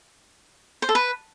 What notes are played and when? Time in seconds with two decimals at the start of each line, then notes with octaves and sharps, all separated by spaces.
0.82 C5
0.89 A4
0.95 B4